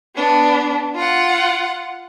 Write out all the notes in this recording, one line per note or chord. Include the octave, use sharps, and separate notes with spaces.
B3 D4
F4 F#5